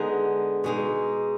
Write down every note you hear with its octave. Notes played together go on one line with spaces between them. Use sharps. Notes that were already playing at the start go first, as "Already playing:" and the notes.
Already playing: D3 G#3 B3 D#4
B2 G#3 D#4